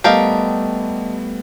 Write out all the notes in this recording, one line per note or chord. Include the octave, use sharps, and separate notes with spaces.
G3 A3 B3 G4 A#4 D#5 F5 A5